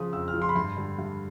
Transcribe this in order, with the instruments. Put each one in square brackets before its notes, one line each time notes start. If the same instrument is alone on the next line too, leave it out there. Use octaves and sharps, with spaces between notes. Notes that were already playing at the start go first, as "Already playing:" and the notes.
Already playing: [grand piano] C#3 F3 D#6
F2 E6
F6
C#3 F3
C6
B5
G2 C6
D3 G3
G2